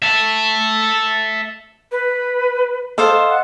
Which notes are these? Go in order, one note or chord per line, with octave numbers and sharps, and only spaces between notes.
E5 A5
B4
A4 C5 D#5 F5
F#5